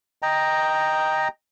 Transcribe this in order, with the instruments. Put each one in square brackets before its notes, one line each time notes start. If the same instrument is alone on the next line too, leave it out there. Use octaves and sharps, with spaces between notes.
[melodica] D#5 G5 A#5